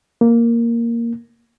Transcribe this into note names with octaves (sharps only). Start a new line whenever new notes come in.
A#3